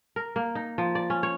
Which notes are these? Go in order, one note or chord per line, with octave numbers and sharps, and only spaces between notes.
A#4
A#3
D#4
F3
D5
C#4
C#5